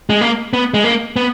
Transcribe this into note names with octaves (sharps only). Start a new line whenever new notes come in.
G#3
A#3
B3
G#3
A#3
B3